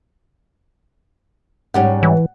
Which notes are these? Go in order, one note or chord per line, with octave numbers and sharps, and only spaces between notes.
G#2 G3 C#4 F#5
E3